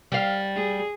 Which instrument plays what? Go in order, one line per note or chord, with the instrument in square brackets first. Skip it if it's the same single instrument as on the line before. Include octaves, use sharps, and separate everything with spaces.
[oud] G3 F5
[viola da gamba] G#4